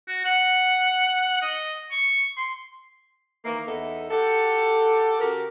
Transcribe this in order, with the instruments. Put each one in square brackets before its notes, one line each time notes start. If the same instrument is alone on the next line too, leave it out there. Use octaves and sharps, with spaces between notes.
[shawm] F#4
F#5
D#5
C#6
C6
[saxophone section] D#3 E3 A#3
E2 B3 D#4 A4 E5
F#4 G4 A4
C#3 F#4 G4 A#4